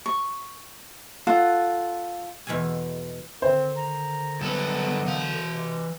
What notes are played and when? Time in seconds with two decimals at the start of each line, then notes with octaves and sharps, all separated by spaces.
0.06 C#6
1.27 F4 A4 F#5
2.47 E2 B2 G#3 A4 G#5
3.42 D3 D#3 C4 C5
3.76 A#5
4.41 G2 F#3 G#3 B3 A4 B4
5.06 E3 F5
5.51 C3 G#3